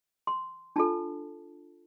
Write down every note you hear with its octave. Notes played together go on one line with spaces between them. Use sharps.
C6
D4 F4 A4 A5